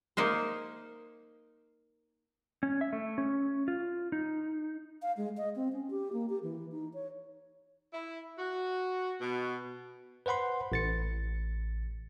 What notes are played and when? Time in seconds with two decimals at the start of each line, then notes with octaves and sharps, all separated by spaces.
0.17 A#3 D#4 A#4 C5
2.63 C#4
2.81 E5
2.93 A3
3.18 C#4
3.68 F4
4.12 D#4
5.02 F5
5.17 G#3
5.37 D#5
5.56 C4
5.73 C#4
5.90 G4
6.13 A#3
6.29 G4
6.43 E3
6.72 D#4
6.94 C#5
7.93 E4
8.38 F#4
9.21 B2
10.26 B4 C5 F#5 B5 C6
10.72 A1 A6 C#7